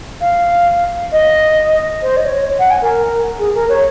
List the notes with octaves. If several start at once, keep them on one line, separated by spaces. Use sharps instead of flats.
F5
D#5
C5
D#5
C#5
F#5
G#5
A#4
G#4
A#4
C#5